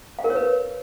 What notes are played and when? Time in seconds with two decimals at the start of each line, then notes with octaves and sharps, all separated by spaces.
0.19 F5
0.24 A#4
0.30 C#5
0.36 B4